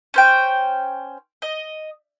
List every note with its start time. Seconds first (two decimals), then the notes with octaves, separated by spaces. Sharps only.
0.14 C#4 C5 G5
1.42 D#5